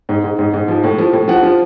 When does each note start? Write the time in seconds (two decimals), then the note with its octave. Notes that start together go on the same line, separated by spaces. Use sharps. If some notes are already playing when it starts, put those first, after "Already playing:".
0.09 G#2
0.24 G#2
0.39 G#2
0.54 G#2
0.68 F3
0.84 A2
0.98 F3
1.13 A2
1.28 F3 F#5
1.43 F3